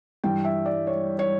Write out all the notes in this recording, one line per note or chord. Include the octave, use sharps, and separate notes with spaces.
G2 E3 G5
E5
D5
C#5
C#5